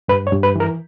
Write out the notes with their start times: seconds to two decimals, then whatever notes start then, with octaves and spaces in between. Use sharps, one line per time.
0.08 G2 B4
0.27 C#5
0.32 G2
0.43 B4
0.56 E3 A#4